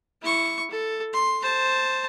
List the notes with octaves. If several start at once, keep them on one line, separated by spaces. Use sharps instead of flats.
E4 C#6
A4
C6
C5 A5